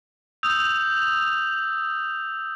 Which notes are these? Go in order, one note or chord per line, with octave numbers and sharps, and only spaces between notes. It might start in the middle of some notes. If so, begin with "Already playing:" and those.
D#6 E6 G6 F7